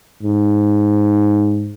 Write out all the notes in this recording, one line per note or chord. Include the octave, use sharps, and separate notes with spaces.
G#2